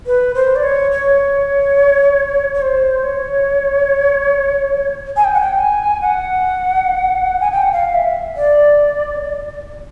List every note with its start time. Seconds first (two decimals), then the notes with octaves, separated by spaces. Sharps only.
0.06 B4
0.35 C5
0.56 D5
0.63 C#5
0.92 C#5
2.54 C#5
2.62 C5
3.04 C#5
5.16 G#5
5.24 G5
5.34 F#5
5.40 G5
5.59 G#5
6.01 F#5
7.41 G#5
7.52 G5
7.62 F#5
7.72 F5
7.94 E5
8.36 D5